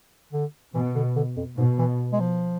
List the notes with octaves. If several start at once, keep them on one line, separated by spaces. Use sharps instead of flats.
D3
B2 E3
D3
D3
F2
G#2 B2
E3
G#3
F3